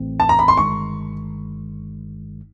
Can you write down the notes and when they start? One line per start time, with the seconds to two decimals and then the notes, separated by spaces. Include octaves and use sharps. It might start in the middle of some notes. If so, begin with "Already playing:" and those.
Already playing: A1 A2 E3 A3 C4
0.20 A5
0.29 A#5
0.39 B5
0.48 C6
0.57 G1 G2 D#3 G#3 C#6